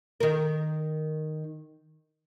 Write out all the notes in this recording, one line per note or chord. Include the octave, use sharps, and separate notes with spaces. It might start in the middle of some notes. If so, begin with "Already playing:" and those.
D#3 A#4